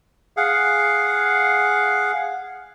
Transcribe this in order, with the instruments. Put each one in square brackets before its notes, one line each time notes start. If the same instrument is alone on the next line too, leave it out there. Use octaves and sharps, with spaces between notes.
[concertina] G#4 F5 F#5